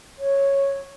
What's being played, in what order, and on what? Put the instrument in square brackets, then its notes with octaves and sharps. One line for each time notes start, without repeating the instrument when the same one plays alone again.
[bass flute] C#5